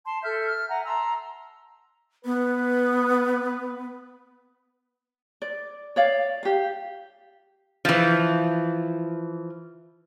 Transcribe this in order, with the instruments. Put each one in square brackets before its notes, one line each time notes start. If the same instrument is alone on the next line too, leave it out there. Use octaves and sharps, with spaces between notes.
[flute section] A5 C6
A4 E5 F6 G6
F6
E5 F#5 G#5 A#5
A5 A#5 C6 E6
[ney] B3 [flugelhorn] B4
[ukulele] D5
C#5 D5 F5
G4 F5
[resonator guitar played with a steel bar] E3 F3